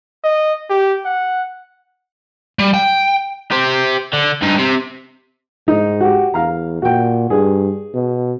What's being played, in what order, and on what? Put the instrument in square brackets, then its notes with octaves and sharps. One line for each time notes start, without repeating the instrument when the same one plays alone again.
[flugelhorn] D#5
G4
F#5
[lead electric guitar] G3
G5
[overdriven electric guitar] G4 C5
D3
G2 D#4
C3
[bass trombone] G#2 [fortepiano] D#4
[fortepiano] F#4 G4
[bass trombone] E2 [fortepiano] F5 A#5
[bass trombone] A#2 [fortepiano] F#4 G5
[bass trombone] G2 [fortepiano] G#4
[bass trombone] B2